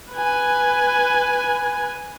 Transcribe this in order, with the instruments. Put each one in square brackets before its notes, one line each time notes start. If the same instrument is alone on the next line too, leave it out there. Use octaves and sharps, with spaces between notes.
[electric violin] B4 G#5